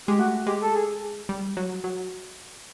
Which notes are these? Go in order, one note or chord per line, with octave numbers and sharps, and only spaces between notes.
G#3 G4
A3 F#4
G#3 G4
A4
G#4
G3
F#3
F#3